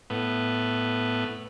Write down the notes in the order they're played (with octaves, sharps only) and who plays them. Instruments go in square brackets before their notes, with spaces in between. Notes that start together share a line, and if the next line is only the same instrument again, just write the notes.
[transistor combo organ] A2 B3